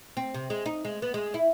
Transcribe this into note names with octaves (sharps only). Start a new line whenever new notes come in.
C4
C3
G#3
D#4
G#3
B3
G#3
E4